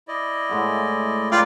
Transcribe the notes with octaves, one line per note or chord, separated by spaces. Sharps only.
E4 D5 D#5
A2 G#3 F#5
F2 D#4 F4 B4 D5 G5